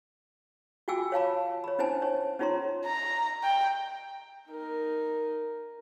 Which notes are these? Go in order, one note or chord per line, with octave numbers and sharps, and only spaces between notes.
F4 F#4 G5 G#5 D6 E6
C#5 F5 A5 B5
C#5 B5
C#4 D4 E4 C5 G#5 A5
C#5
C#4 D#4 F4 C#5 A#5 C6
A#5
G5
D#4 A#4